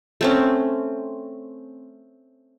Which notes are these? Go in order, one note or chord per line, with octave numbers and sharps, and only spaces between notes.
A3 C4 C#4